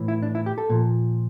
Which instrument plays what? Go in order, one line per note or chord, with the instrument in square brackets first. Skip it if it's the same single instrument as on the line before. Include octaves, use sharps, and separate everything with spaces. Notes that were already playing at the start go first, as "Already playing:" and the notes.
Already playing: [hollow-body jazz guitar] A2 E3
E4
D4
E4
G4
A4
A#2 F3